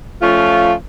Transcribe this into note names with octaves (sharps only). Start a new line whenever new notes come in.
F3 A3 C#4 F4